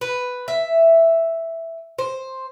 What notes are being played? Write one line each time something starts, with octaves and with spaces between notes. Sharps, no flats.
B4
E5
C5